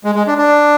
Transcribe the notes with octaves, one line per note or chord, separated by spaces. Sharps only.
G#3
G#3
D4
D4